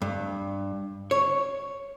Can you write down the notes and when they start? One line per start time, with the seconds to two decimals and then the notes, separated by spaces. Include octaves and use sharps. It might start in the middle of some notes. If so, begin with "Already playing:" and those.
0.02 G2
1.11 C#5